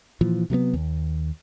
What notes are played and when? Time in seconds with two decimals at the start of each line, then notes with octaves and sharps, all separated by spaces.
0.21 A#2 E3 F3
0.50 C3 F#3 A3 B3
0.74 D#2